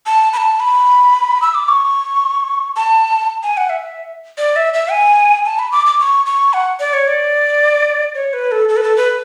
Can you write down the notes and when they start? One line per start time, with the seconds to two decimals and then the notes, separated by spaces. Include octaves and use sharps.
0.06 A5
0.33 B5
0.37 A5
0.60 B5
1.42 E6
1.54 D6
1.68 C#6
2.76 A5
3.43 G#5
3.57 F#5
3.69 E5
4.38 D5
4.56 E5
4.74 E5
4.91 G#5
5.45 A5
5.59 B5
5.72 D6
5.86 D6
6.00 C#6
6.26 C#6
6.53 F#5
6.80 D5
6.93 C#5
7.08 D5
8.15 C#5
8.33 B4
8.52 A4
8.69 A4
8.77 B4
8.83 A4
8.96 B4